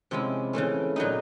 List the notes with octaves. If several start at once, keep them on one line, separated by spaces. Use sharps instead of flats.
C3 F3 G#3 C#4 E4
C#3 E3 A3 C#4
A#2 F#3 B3 D#4